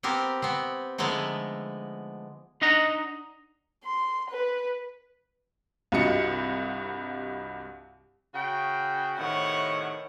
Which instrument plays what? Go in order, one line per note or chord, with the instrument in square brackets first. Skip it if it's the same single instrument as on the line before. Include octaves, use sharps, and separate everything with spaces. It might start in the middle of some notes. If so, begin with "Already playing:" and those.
[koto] B3 C4 G4 A#4
B3 C4
D3 F3 G#3 A3 B3 D#4
[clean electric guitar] D4 D#4 D#5 F#5 A#5
[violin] C6
B4
[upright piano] C2 G2 F4 F#4 D#5 C#7
[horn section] C#3 F#4 G5
[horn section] A2 C3 D#3 [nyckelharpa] C#5 F#5